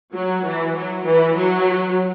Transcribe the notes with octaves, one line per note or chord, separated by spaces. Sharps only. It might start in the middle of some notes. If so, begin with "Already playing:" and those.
F#3
E3
F#3
E3
F#3